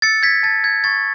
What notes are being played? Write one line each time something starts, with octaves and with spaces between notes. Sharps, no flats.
E6 A6 C#7
G#6 B6
A5 A6
G#6
C#6 A6